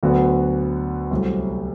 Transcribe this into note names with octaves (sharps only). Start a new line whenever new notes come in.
D2 D3 F#3 B3 F#4
C2 C3 F#3 A3